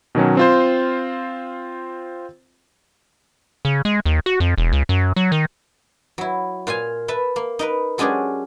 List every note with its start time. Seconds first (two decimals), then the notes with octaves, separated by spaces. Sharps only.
0.15 B2 D#3 F#3 C#4
0.37 C4 F4 C5
3.65 C#3
3.85 G#3
4.05 D#2
4.26 F#4
4.40 F2
4.58 E1
4.73 C#2
4.89 F#2
5.16 F#3
5.32 D#3
6.18 F#3 E4
6.67 A#2 F4 F5 G#5
7.08 B4 E5 A5
7.36 A#3
7.59 D#4 A#4 B4
7.98 F#3 G#3 C#4 D4 G4 G#4